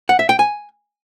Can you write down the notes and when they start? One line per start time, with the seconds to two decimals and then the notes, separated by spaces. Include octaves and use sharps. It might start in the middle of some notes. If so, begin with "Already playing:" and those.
0.09 F#5
0.19 E5
0.29 G5
0.39 G#5